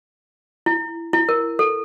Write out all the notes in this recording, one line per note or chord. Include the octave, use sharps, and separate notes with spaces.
E4
E4
A#4
A4